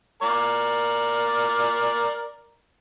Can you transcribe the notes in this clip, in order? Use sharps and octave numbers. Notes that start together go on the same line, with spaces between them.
A#4 D5